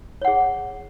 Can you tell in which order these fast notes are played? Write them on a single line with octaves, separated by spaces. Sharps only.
C#5 F#5 G#4